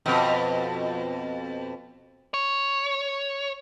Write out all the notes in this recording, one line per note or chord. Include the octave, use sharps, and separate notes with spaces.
F2 B2
C#5